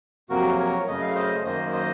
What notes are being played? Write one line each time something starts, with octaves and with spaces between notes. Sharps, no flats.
F2 C3 F#3 A#3 F#4 A#4
A#4 C#5
F#2 C#3 A3 D#5
F5
C5 D#5
F#2 D#3 A#3 C5 D#5
C5 D#5